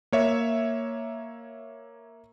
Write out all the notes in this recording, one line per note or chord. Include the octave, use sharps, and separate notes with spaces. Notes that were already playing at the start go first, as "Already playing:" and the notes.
A#3 C#5 E5